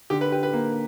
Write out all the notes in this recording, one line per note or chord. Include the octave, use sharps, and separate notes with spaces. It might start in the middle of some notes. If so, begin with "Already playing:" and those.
D3 G4
B4
G4 B4
B4
A#3